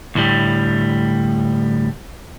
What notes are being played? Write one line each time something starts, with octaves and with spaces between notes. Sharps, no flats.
D2 A2 G3